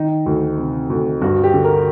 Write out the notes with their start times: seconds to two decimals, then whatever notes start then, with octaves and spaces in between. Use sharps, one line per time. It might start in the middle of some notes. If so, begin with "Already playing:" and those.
Already playing: D#3 D#4
0.26 D2
0.58 C3
0.90 D2
1.21 G2 F#4
1.44 G4
1.54 D3
1.64 A#4